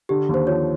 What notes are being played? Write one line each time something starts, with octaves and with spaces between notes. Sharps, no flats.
D3 G4
D#2
C5
F3 C#5